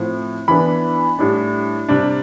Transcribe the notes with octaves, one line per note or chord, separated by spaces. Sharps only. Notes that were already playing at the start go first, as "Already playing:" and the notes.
Already playing: A2 F3 C4
E3 B3 D4 B5
A2 G3 D4
C3 G3 D4